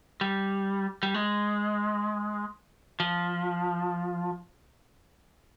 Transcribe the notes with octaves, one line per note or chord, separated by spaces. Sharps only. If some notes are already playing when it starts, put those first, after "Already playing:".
G3
G3
G#3
F3